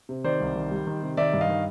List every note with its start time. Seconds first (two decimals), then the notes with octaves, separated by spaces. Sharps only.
0.09 C3
0.24 D#3 C5 D5
0.41 C2
0.56 D#3
0.71 G3
0.87 D#3
1.02 C3
1.17 D#3 D5 E5
1.34 G2
1.41 D#5 F5
1.49 D#3